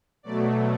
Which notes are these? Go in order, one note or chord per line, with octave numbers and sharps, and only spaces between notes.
B2 F#3 A3 D5